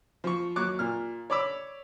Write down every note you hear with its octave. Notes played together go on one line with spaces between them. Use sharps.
F3 C#6
D#2 F#3 C#6 D6 F#6
A#2 F6
C#5 D5 B5 D6 E6